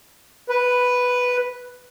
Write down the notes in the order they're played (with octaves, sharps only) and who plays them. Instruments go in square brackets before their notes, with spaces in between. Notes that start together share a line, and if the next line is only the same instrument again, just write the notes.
[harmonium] B4